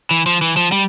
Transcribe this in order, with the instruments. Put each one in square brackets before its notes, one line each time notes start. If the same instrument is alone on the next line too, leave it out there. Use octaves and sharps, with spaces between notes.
[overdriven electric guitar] E3
F3
E3
F3
G3